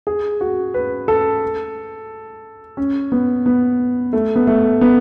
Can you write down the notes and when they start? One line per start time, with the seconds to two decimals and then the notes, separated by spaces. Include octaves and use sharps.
0.07 G#4
0.41 F#4
0.74 B4
1.08 A4
2.77 C#4
3.12 B3
3.46 B3
4.13 A3
4.36 B3
4.47 A3
4.81 B3